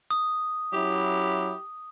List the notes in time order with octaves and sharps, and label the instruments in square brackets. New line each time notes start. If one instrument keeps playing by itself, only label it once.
[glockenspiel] D#6
[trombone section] F#3 C#4 E4 [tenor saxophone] G4